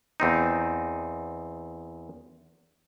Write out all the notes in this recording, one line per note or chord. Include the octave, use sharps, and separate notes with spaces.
E2 C4 D#4